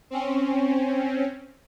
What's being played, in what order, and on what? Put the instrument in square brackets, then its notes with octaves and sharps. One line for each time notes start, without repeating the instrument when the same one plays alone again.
[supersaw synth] C4 C#4